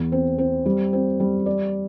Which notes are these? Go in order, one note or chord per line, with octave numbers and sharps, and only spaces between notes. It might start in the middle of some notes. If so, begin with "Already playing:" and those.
Already playing: E2
C4
C4
G3
C4
G3
D5